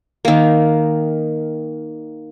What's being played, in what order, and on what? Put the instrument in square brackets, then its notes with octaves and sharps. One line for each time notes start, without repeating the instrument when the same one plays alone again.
[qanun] D#3 A#3